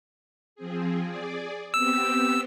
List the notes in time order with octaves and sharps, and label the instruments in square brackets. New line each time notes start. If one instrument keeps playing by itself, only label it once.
[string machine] F3 C4 G#4
G#4 D5
[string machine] B3 C4 G4 [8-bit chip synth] E6